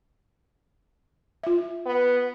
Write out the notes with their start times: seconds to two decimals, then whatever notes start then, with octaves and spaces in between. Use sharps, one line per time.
1.43 F4 E5
1.86 B3